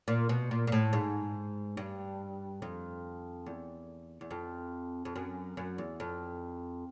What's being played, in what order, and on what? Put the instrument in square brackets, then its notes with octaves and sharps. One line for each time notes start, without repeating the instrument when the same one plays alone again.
[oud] A#2
B2
A#2
A#2
A2
G#2
G2
F2
E2
E2
F2
F2
F#2
F#2
E2
F2